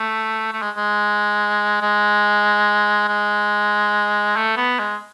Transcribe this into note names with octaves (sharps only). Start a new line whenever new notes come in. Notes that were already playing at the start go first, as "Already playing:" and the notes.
Already playing: A3
A3
G#3
G#3
G#3
G#3
A3
B3
G#3